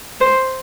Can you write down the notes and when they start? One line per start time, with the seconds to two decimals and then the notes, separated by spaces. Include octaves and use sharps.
0.21 C5